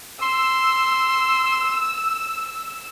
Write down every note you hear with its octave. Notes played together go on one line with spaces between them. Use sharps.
C6 E6